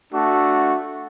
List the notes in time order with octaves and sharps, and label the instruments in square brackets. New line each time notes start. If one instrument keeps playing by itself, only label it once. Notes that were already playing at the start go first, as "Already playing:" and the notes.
[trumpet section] A3 D4 F#4